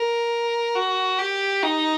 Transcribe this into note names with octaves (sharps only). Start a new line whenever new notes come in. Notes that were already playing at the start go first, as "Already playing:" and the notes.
Already playing: A#4
F#4
G4
D#4